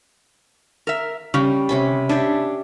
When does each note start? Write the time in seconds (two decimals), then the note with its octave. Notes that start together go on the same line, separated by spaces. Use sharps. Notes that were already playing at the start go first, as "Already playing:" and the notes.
0.87 A#4 E5
1.34 C#3 G3
1.69 C3 C#4 B5
2.09 D4 G4 C#5 E5